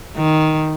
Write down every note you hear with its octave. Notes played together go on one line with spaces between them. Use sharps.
D#3